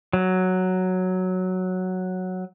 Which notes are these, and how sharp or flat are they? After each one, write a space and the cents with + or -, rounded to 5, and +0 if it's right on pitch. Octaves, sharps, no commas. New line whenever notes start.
F#3 +0